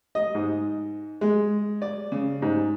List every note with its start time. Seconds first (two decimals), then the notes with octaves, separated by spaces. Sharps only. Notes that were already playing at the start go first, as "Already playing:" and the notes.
0.15 D#5
0.35 G#2
1.21 G#3
1.82 D5
2.12 C#3
2.42 G#2